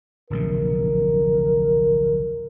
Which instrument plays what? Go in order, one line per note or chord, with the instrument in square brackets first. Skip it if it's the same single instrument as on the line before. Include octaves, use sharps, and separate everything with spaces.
[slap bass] D1 A#1 C3 [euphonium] A#4